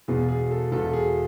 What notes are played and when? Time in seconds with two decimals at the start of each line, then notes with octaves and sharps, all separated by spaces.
0.08 E1 E2 B2 G#4
0.29 G#4
0.51 A4
0.72 E1 E2 B2 A4
0.93 G#4